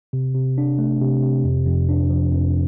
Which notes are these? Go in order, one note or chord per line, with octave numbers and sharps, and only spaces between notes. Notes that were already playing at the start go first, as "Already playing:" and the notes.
C3
C3
D4
A3
C3
C3
F2
F2
D4
F3
F2